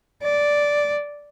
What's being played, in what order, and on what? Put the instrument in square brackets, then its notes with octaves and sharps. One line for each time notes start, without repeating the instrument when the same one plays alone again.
[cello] D5